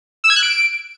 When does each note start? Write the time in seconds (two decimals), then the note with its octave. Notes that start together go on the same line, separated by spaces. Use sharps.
0.24 E6
0.30 G#6
0.36 F#6
0.43 D7